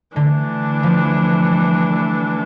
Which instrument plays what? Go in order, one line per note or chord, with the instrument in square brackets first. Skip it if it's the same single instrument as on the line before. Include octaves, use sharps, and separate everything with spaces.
[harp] D3 [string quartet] E3 A3 D4
[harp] F3
G3